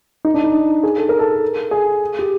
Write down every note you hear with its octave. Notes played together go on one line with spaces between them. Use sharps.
D#4
D4
D#4
G#4
A4
A#4
A4
G#4
G4